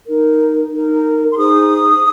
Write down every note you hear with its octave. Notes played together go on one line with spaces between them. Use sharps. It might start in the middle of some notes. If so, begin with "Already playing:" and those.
D#4 A#4
D#4 A#4
C6
D#4 G#4 C5 D#6